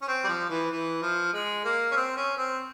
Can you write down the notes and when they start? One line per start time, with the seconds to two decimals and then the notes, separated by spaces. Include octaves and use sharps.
0.02 C#4
0.08 C4
0.24 G3
0.29 F3
0.50 E3
0.71 E3
1.02 F3
1.33 G#3
1.65 A#3
1.91 C#4
1.96 C4
2.17 C#4
2.37 C4